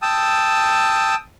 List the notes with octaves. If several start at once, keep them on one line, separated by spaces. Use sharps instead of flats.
G5 A5 D#6 E6